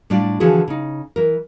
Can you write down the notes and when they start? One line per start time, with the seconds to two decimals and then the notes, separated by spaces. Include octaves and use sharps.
0.10 A2 G3 D4 F4 D5
0.40 D3 E3 F3 F#4 G#4
0.68 C#3 D#4
1.16 E3 A#4